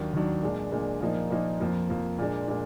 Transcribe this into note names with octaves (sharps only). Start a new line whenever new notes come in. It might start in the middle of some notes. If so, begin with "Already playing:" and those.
Already playing: D#2 D#3 F#3 D4
D#2 D#3 F#3 D4
A#2 G#3 D4
A#2 G#3 D4
A#2 F3 A#3 D#4
A#2 F3 A#3 D#4
F2 F3 A#3
F2 F3 A#3
A#2 G#3 D4
A#2 G#3 D4